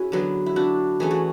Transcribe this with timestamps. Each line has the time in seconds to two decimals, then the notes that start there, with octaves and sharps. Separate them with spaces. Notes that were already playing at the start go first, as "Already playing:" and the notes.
Already playing: C#4 E4 F#4 G#4
0.12 D3 F#3 B3
0.46 E4
0.56 D4 F#4
1.00 E3 A3 C#4 G#4
1.11 F#4